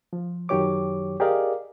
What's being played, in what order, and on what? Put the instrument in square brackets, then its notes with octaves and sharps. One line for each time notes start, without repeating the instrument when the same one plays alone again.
[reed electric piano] F3
F#2 D#3 F#3 G4 C#5 D6
G4 G#4 A#4 D5 D#5 F5